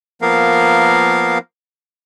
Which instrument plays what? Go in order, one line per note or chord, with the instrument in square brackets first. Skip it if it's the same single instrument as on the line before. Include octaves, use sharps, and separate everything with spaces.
[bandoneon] F3 A#3 B3 A#4 F5